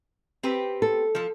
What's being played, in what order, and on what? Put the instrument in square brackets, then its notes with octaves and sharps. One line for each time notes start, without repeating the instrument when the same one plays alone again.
[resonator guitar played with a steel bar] C4 G4 B4
[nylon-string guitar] A4
[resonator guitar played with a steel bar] F3 A4